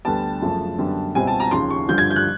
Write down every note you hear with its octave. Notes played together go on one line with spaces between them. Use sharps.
D2 D3 G3 B3 A5
F#2 C#3 F3 A3
F#2 D3 G3 B3
C#2 B2 G3 C4 G#5
A5
A#5
D#2 C#3 F3 C6
C#6
G2 D3 F3 G6
G#6
G6
F#6